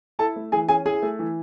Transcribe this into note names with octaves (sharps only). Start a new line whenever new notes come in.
E4 A4 A5
A3
E3 G#4 G#5
C#4 G#4 G#5
E4 G#4 G#5
A3
E3